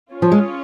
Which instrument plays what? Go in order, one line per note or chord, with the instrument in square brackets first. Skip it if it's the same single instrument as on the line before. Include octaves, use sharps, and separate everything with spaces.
[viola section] C#4 F4 C#5
[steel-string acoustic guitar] F3
G#3